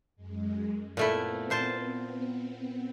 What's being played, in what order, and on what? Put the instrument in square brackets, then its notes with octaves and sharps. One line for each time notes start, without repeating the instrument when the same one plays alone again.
[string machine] F#2 G#3
[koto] A#2 A3 E4 [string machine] B3 C4
[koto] A#2 C5 A5